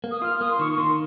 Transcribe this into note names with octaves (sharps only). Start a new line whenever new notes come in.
A#3
D#6
F4 F6
A#3 D#6
C6
D#3 C#6
C#6
D#3 C6